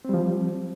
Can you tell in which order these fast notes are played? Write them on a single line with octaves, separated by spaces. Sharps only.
C4 G3 F3